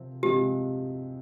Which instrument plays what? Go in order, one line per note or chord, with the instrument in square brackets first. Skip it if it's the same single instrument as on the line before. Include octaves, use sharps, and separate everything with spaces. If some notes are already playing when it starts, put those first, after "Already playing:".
Already playing: [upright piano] C3 F3 C4
[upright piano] C3 F3 G#3 C4 [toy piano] G4